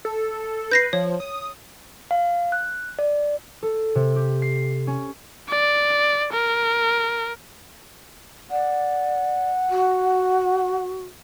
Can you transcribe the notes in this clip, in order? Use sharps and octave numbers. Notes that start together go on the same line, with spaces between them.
A4
B4 G6 A#6 C7
F3 C#5
D#6
F5
F#6
D5
A4
C3
G4
C7
C#4
D5
A#4
D5 F#5
F#4